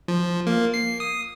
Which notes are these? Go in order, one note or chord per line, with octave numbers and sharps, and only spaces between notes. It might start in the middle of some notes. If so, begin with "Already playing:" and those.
F3
A#3
C7
D#6